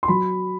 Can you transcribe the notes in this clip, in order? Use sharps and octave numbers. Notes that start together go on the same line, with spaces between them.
C6
F#3 B5